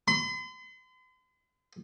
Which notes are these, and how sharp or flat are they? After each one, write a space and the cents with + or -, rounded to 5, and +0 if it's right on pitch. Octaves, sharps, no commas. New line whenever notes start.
C6 -45